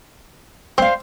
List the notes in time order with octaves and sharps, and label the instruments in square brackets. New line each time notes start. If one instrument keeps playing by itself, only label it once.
[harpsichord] C4 [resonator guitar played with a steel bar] C5 F5